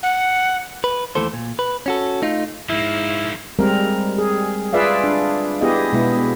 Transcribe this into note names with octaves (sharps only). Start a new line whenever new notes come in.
F#5
B4
D#2 E3 A3 A4 C5
A#2
B4
C#4 F#4 A4
A3 D#4 F4
G#2 F3 A#3 E4
G3 G#3 C4 A#4
G#4
F4 G#4 B4 D5 E5 F5
D4
B3 E4 G4 G#4 D#5
B2 G#3 B3 E4